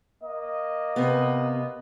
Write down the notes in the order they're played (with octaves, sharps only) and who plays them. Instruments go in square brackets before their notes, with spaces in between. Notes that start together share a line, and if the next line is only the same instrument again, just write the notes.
[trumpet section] A#3 D#5
[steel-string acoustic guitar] C3 B3